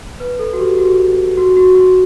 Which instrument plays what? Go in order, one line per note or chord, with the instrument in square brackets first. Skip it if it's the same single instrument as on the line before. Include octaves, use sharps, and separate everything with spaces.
[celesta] B4
A4
F#4
G4
F#4
F#4
F#4
F#4